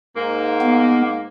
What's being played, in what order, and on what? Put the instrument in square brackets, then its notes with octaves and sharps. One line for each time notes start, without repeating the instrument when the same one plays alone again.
[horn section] G#2 A#3
[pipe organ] B3